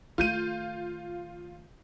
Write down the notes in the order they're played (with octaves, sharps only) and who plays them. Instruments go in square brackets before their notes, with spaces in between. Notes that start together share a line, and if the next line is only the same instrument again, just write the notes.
[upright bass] D#3 A3 [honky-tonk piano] F4 G6 D#7